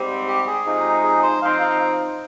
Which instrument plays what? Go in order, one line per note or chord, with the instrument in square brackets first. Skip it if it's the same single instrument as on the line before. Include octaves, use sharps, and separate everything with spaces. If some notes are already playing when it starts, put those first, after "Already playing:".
Already playing: [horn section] G#2 G3 C4
[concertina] G4
G#4
[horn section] C3 F3 G#3 D#4
[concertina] G#4
C5
[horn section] F3 C4 D#4 [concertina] F5
[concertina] F5